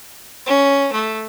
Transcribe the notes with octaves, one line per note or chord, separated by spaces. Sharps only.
C#4
A3